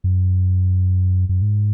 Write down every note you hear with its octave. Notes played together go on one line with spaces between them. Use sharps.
F#2
F#2
G#2